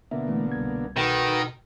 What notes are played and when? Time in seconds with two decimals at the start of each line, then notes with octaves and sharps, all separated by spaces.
0.11 B2 D3 A#3 E5
0.28 E1 E3 A3
0.52 C2 G#6
0.96 B2 D#3 F#4 A4 B4